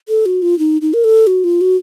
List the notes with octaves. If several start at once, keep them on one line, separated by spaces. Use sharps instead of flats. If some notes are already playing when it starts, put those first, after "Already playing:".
A4
F#4
F4
D#4
D#4
A#4
A4
F#4
F4
F#4